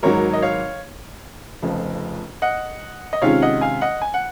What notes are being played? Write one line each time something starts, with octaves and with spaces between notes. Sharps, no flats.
G#1 G#2 F#3 A#4 C#5
D#5
C#5 F5
F1 F2 C#3 F3
D#5 F#5
D#5
C3 D#3 G#3 C#4 F4 C#5 F5
D#5 F#5
F5 G#5
D#5 F#5
G#5
F#5